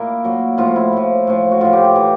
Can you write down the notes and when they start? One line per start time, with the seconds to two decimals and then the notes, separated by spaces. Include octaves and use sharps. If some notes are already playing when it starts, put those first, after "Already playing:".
Already playing: A#2 E4 A#4 D5
0.25 A#2 F#3
0.58 A2 F3 F4
0.76 E4
0.93 A2 F3
1.27 A2 F3
1.51 F#4
1.61 A2 F3 F4
1.73 G4
1.84 G4
1.96 E3